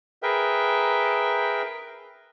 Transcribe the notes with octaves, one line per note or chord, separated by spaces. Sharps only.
G#4 A#4 B4 E5 G5